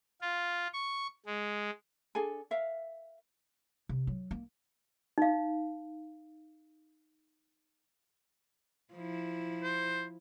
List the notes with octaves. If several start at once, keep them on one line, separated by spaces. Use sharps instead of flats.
F4
C#6
G#3
D4 G#4 A4 G#5
A#4 E5 F5
C3
F#3
A#3
D#4 F5
F3 E4
C5